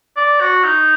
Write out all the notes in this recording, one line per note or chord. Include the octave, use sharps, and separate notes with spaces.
D5
F#4
D#4